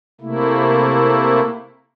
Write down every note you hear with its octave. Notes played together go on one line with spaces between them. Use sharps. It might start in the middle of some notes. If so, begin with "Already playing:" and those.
C3 A3 A#3 E4